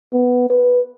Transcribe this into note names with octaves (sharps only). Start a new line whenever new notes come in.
B3
B4